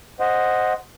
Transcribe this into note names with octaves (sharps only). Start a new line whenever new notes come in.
C5 D#5 F#5